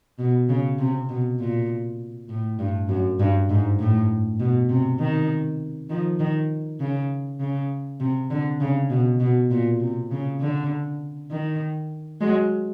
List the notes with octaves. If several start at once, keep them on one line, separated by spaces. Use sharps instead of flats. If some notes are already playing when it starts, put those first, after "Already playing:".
B2
C#3
C3
B2
A#2
A2
G2
F#2
G2
G#2
A2
B2
C3
D#3
D#3 F3
D#3
C#3
C#3
C3
D3
C#3
B2
B2
A#2
C3
C#3
D3
D#3
F#3 G#3